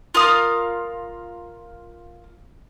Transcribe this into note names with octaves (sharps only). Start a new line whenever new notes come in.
F4 A#4 F5 D#6